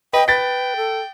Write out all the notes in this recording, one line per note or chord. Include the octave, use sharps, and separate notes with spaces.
B4 D#5 G5
B4 G5 A6 B6
A4